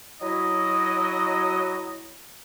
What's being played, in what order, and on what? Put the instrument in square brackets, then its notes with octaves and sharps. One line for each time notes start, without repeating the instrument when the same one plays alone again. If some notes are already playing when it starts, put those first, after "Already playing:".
[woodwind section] F#3 E4 D#5